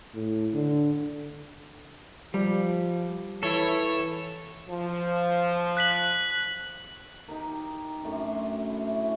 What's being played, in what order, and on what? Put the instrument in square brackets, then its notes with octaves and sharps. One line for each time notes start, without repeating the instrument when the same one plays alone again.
[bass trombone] A2
D3
[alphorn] F3 [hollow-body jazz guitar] G3
[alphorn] E3 [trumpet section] E4 C#5 [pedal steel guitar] A4
[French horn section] F3
[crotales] F#6 B6 F#7
[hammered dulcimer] D#4 G4 A#4
G4
F#2 A3 D4 B5
C6
E4
C#4